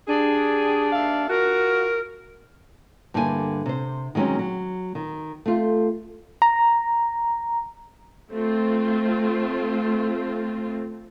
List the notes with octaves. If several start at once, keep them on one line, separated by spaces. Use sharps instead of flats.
D4 G4 G#4
D#2 E5 F5
F4 F#4 A#4
G2 D3 A#3 E4 G4 G#5
C3 C5
D#3 F#3 G#3 C4 C#4
F#3
D#3
A3 C4 F4
A#5
A3 C4 F4